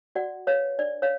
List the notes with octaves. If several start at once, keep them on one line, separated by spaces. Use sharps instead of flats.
F#4 D5 F#5
B4 C#5 F5
D4 D5
C#5 F5